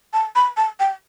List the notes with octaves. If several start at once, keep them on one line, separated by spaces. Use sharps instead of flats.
A5
B5
A5
G5